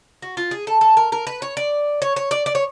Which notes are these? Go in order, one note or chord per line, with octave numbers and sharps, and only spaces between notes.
F#4
F4
G#4
A4
A4
A#4
A#4
B4
C#5
D5
C#5
C#5
D5
D5
C#5